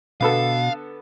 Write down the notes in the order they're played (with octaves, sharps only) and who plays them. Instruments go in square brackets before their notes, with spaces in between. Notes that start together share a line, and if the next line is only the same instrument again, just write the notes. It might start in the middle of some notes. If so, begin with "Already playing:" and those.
[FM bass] B2 [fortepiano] D3 B3 A4 [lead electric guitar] F5